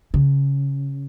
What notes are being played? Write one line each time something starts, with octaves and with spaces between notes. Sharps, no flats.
C#3